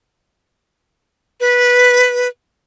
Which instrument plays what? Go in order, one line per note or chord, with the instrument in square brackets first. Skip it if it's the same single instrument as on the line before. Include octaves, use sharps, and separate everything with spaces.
[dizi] B4